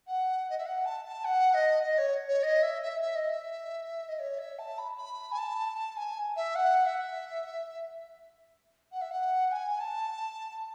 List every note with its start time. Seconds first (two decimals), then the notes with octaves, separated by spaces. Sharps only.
0.07 F#5
0.50 D#5
0.58 E5
0.66 F#5
0.85 A5
1.05 A5
1.25 F#5
1.54 D#5
1.84 D#5
1.98 C#5
2.28 C#5
2.43 D#5
2.63 E5
2.83 E5
3.01 E5
3.16 D#5
3.30 E5
4.09 D#5
4.20 C#5
4.39 E5
4.59 A5
4.78 B5
4.98 B5
5.32 G#5
5.38 A5
5.97 G#5
6.36 E5
6.55 F#5
6.86 E5
8.92 F#5
9.01 E5
9.11 F#5
9.52 G#5
9.80 A5